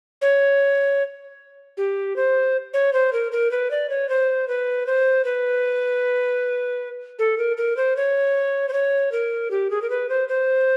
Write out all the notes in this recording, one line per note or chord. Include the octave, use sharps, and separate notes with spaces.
C#5
G4
C5
C#5
C5
A#4
A#4
B4
D5
C#5
C5
B4
C5
B4
A4
A#4
A#4
C5
C#5
C5
C#5
A#4
G4
G#4
A#4
B4
C5
C5